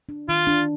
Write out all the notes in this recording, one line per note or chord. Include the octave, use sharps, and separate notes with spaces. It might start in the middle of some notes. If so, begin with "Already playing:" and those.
D4
D#3 F4
D4